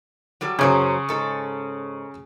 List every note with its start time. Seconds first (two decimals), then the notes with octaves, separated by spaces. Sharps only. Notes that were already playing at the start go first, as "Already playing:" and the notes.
0.41 F#3 G3 A4
0.59 F#2 C#3 F#3 C#4 C5
1.09 G#2 A4